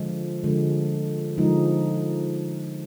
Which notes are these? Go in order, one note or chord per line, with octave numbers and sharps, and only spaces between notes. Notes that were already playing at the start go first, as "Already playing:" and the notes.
Already playing: D3 F3 G#3
D3 F3 G#3
D3 F3 G#3 D#4